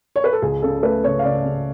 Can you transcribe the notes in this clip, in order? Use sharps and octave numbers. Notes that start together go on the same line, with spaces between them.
C#5
B4
A4
C#2 G#4
C#3 A4
A3 B4
C#3 C#5
F5
C#3 D5
C#3